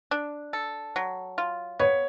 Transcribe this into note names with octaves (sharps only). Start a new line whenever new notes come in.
D4
A4
F#3
F4
B3 C#5